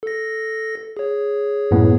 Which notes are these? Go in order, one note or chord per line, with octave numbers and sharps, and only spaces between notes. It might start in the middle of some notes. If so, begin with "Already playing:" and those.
A4 A#6
G#4 C#5
F#2 A2 B3